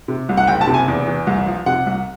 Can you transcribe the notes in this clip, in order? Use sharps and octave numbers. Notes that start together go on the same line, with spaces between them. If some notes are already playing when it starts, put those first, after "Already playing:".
C3
C2
F#5
F#1 G5
A5
C3
G#5
E2
E3
C2
F3
C3 F#5
C2